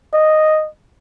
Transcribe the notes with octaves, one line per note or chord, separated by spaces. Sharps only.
D#5